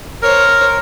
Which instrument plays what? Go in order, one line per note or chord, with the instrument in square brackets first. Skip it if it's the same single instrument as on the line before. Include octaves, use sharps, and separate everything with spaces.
[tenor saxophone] A#4 [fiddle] C5 C#5